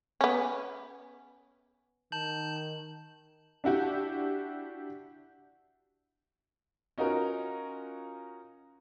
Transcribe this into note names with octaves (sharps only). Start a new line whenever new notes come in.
B3 C#4
D#3 A5 G6 F#7
D4 E4 F#4 G4
C#4 D#4 F4 F#4 A#4